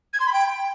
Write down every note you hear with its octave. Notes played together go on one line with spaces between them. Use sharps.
G#6
C6
B5
G5